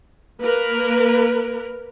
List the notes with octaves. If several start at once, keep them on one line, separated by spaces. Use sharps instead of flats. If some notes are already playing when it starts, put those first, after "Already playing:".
A#3 A#4 B4